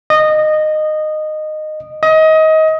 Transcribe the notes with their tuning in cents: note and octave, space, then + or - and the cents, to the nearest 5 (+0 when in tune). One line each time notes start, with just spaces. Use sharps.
D#5 -15
D#5 +25